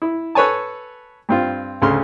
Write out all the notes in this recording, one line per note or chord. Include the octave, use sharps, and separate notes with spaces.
E4
A4 B4 C#5 G#5 A5
G2 C4 F4
D2 C#3 A3 C6 F6